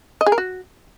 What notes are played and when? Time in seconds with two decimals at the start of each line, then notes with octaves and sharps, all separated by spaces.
0.21 D#5
0.26 G#4
0.32 A#4
0.38 F#4